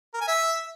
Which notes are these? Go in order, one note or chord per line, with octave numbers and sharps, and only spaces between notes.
A#4
G#5
E5